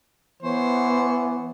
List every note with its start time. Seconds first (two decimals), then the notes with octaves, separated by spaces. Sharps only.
0.42 E3 B3 C5 C#5